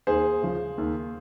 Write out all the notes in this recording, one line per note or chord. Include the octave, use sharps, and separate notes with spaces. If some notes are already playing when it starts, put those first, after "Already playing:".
D#2 G#4 C5
C#3 F3
D#2